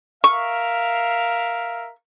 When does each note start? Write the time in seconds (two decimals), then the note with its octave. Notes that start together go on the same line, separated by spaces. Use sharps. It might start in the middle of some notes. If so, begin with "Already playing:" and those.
0.24 A#4 E5 F5 C#6